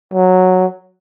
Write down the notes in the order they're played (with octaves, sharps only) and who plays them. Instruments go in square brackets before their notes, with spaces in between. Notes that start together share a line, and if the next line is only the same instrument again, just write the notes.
[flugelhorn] F#3